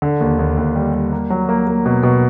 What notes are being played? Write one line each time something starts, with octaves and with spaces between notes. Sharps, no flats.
D3
D#2
D#2
D#2
G3
G3
A#3
F#3
A#3
A#3
B2
B2